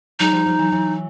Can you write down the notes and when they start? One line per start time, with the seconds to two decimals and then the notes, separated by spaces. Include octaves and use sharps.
0.19 F#3 G#3 D#4
0.32 F3 G3
0.46 F3 G3
0.59 E3 F#3
0.72 E3 F#3